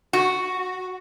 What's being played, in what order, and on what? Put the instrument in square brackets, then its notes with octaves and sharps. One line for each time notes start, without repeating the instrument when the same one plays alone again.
[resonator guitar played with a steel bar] F#4